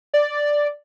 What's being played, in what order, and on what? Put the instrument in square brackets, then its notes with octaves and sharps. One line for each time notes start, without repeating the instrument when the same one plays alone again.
[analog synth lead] D5